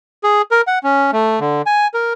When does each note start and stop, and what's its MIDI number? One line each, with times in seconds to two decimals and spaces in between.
0.24 0.42 68
0.51 0.61 70
0.67 0.79 78
0.84 1.11 61
1.13 1.40 57
1.40 1.62 50
1.66 1.88 80
1.94 2.13 70